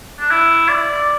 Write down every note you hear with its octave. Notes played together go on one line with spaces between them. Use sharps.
D4
E4
D5